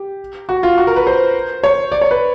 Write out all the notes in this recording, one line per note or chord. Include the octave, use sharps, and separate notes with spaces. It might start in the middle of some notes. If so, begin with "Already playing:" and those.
Already playing: G4
F#4
F4
F#4
A#4
B4
C5
C#5
D5
C#5
B4